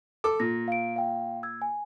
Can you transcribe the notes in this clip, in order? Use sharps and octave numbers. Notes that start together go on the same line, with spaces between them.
A4 D6
A#2 A#6
F5 D7
F5 G5
E6 G#6
G#5